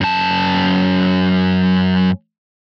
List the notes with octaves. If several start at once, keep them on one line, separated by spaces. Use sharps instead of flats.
F#2 A5